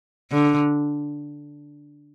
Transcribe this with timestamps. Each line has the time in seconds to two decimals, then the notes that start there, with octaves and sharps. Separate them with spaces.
0.31 D3